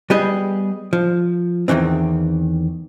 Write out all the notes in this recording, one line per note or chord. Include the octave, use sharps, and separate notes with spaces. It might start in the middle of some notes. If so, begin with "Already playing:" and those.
G3 B3 G4 G#4 D#5
F3
E2 G2 D#3 E3 C4